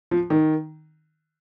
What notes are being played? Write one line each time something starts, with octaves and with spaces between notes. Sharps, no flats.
F3
D#3